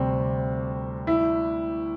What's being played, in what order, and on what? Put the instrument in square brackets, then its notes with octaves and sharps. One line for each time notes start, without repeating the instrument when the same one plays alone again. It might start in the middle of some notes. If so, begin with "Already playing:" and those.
Already playing: [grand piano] D2 C3 G3 [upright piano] C4
[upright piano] E4